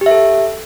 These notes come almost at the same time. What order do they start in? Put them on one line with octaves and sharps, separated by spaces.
G4 E5 A4